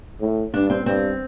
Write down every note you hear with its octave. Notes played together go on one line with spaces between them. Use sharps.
A2
G2 D4
C4
G2 C4